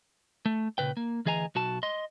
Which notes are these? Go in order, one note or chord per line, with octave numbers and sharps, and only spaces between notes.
A3
A#2 C#3 B4 G5
A#3
D2 E3 G#4 D#5 G#5 A#5
B1 F#4 A5
D#5 C6